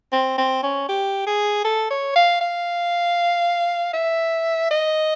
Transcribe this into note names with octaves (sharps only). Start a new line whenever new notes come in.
C4
C4
C#4
G4
G#4
A4
C#5
F5
F5
E5
D#5